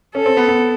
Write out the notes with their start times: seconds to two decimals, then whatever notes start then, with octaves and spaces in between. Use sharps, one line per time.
0.15 C#4 A4
0.26 C4
0.37 B3
0.48 B3